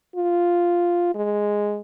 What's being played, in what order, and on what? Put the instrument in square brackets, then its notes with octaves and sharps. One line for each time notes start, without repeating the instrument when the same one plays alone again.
[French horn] F4
G#3